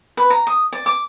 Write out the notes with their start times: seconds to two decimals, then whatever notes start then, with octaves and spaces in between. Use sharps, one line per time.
0.17 B4
0.30 A#5
0.47 D#6
0.72 D5
0.86 D6